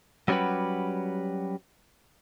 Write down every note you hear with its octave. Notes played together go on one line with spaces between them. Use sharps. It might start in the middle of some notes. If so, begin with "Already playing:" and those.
F#3 G3 C#4 F#4 G4 B4